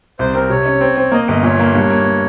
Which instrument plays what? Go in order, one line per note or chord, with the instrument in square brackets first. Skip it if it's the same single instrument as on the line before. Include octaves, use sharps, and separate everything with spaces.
[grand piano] C2 [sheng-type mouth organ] C5
[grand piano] C4 [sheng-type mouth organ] A#4
[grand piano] C3 [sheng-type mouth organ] C#5
[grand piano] C#4
C4
C4
[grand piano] A#3 [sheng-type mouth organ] D#5
[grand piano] G1 [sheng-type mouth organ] D#5
[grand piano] A#2 [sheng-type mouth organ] C#5
[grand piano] A#3
G2
A#3